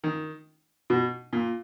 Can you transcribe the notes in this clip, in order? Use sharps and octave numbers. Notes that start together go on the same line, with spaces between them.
D#3
B2
A#2